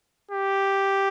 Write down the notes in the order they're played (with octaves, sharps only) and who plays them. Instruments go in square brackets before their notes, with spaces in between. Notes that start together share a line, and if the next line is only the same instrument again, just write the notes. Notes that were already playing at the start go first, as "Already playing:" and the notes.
[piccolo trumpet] G4